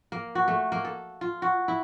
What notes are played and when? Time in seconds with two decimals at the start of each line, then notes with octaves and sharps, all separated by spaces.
0.12 A#3
0.35 F#4
0.48 A3
0.72 A#3
0.85 A4
1.21 F4
1.42 F#4
1.68 E4